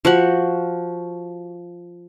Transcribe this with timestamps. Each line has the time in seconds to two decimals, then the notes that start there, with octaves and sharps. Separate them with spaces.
0.05 F3 F#4 F#5